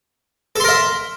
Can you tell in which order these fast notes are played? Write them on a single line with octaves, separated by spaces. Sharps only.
A4 C6 A#4 E5